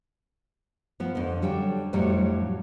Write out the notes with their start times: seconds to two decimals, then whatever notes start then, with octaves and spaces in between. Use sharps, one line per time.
1.00 F3 B3
1.15 F2 D3
1.42 F#3 G3 D4 A4 G5
1.93 F2 A2 F#3 G3 D4